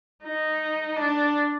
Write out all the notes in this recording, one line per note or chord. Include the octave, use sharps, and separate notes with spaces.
D#4
D4